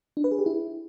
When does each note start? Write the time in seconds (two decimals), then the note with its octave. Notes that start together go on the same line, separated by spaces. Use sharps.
0.17 D4
0.24 B4
0.31 G#4
0.39 G4
0.46 E4